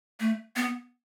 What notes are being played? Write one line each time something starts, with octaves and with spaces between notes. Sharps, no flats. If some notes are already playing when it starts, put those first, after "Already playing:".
A3
B3